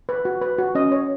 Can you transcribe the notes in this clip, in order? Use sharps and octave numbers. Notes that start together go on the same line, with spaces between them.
B4
F#4
B4
F#4
C#4 D#5
C#5